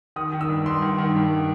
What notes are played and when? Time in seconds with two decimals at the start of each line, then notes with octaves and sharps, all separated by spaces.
0.16 D#3 D#6
0.32 D#3
0.41 E6
0.49 G2
0.66 G2 C6
0.82 D#3
0.98 D#3
1.15 G2